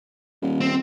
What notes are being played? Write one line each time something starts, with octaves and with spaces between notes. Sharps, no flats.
D#1
C4